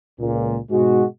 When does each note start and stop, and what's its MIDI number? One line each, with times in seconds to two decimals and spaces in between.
0.20 0.58 37
0.20 0.58 46
0.71 1.04 44
0.71 1.04 47
0.71 1.04 56
0.71 1.04 66